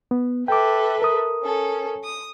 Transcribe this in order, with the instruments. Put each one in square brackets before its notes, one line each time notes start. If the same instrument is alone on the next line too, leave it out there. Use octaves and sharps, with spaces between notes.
[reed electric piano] B3
[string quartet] A4 B4 E5 [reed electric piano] G5 D6
[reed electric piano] A#4 D#6
[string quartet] C#4 A4
D#6